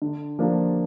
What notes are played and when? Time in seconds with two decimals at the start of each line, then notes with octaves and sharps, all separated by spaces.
0.02 D3
0.39 F3 A#3 D4 F4